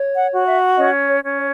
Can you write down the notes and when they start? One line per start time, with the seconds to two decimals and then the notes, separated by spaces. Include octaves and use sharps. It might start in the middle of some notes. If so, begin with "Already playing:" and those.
Already playing: C#5
0.15 F#5
0.32 F#4
0.47 E5
0.77 C#4 D#5
1.07 C#5
1.23 C#4
1.38 C#5